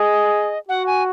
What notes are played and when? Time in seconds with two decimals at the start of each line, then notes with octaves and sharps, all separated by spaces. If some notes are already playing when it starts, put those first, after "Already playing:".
Already playing: G#4 D#5
0.68 F#4 F#5
0.87 G#5